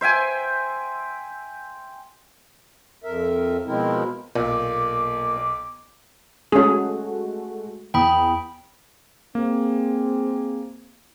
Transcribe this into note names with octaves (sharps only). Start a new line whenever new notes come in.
C5 E5 G5 G#5
F2 A#4 E5
B2 F3 G#3 C4 E4 A#4
B1 A#2 D6
G#3 A3 C#4 F#4 G#4
E2 G5 B5 D#6
A#3 C4 G#4